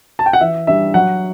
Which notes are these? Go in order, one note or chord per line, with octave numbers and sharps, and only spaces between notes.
A5
G5
F#5
E3 E5
G3 D4 E5
F#3 F#5